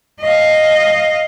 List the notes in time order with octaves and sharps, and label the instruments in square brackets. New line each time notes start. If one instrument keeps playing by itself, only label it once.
[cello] D#5 F5